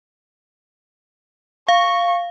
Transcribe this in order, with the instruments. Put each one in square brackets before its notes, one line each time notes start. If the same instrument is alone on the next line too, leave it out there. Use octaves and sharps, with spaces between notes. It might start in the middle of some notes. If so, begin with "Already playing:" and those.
[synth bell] F5 [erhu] C#6